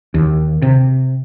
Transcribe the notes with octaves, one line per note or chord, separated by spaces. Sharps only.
D#2
C3